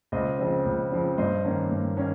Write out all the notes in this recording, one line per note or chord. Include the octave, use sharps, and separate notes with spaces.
C#2 C5 D#5
C#3 F3 C4
C#2
C#3 F3 C4
G2 C5 D#5
D#3 A#3 C#4
G2
D#3 A#3 C#4